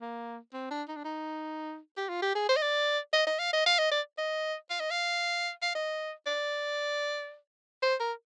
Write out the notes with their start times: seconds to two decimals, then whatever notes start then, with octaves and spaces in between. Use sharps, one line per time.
0.01 A#3
0.53 C4
0.71 D4
0.88 D#4
0.96 D4
1.05 D#4
1.97 G4
2.09 F4
2.22 G4
2.35 G#4
2.49 C5
2.57 D#5
2.62 D5
3.13 D#5
3.27 D#5
3.39 F5
3.53 D#5
3.66 F5
3.79 D#5
3.92 D5
4.18 D#5
4.70 F5
4.80 D#5
4.91 F5
5.62 F5
5.75 D#5
6.27 D5
7.82 C5
8.00 A#4